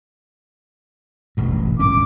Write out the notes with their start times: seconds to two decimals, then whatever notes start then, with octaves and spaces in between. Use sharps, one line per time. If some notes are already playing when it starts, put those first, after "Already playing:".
1.37 E1 A1 G2
1.79 D1 G2 C#4 D6